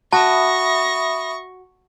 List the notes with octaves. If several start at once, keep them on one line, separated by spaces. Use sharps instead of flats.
F#4 E5 A5 B5 C#6 D#6 A#6